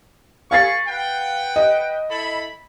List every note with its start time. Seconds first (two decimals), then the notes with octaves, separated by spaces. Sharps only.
0.51 F5 G#5 B5 C#6 A6 C7
0.87 B4 F#5 G5
1.56 D#5
2.10 E4 A4 B5